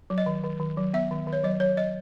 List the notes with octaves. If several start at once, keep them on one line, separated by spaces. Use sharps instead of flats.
F#3
D#5
D#3
D#3
D#3
F#3
B3 E5
D#3
D#3
C#5
F#3 D#5
F#3 C#5
F#3 D#5